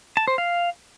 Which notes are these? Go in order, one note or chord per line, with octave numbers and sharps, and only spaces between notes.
A5
C5
F5